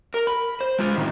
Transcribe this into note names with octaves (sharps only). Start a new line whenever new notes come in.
A#4
B5
C5
G#3 F4
A2 D#3